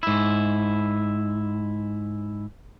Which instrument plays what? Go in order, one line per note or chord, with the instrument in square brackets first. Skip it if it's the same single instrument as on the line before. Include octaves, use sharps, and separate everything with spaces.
[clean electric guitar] G#2 E4